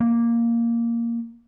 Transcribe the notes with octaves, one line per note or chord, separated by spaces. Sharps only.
A#3